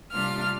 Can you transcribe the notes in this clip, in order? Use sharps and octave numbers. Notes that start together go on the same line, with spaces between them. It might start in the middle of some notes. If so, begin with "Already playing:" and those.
C3 G3 A#3 D4 F4 F6